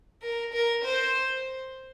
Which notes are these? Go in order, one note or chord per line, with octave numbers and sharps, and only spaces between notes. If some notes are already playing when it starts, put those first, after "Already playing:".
A#4
A#4
C5